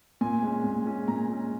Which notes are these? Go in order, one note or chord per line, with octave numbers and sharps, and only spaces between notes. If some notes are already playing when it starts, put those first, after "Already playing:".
A#2 G#5
G#3 C#4
A#2
G#3 C#4
A#2 A#5
G#3 C#4